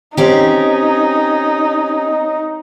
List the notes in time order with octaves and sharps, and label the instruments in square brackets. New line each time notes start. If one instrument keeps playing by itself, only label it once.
[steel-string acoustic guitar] C4 C#4 G4 [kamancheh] D#4